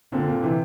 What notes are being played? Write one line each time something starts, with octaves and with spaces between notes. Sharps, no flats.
A#2 D3 C4
A#2 D3
C3 E3